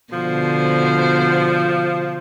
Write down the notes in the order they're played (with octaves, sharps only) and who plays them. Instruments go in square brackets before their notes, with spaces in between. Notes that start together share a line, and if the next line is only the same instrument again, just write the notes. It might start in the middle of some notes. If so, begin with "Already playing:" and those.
[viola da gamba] B2 D3 C5 [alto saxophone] F3